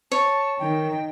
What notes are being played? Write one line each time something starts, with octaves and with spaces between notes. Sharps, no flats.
C#5 A5
D#3 G5